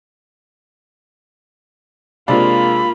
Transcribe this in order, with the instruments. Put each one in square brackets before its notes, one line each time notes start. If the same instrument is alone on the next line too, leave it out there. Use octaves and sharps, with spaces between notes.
[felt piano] C3 G#3 D4 [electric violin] A#3 F4 [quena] B5